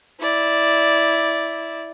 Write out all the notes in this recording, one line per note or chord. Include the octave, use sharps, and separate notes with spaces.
E4 D5